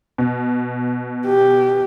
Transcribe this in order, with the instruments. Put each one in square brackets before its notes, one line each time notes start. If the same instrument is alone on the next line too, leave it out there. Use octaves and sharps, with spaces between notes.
[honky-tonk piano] B2
[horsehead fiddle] G4